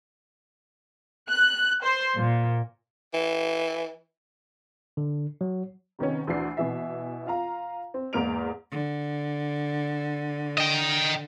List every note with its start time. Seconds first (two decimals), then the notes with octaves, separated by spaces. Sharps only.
1.30 F#6
1.84 C5
2.18 A#2
3.14 E3
4.97 D3
5.41 F#3
5.99 C3 D#3 B3 C#4
6.27 D2 E3 D4 C7
6.57 B2 E3 E5
7.27 F4 F5 A#5
7.94 C4
8.13 E2 G#2 A#3 F6 D7 F7
8.72 D3
10.58 D#5 G5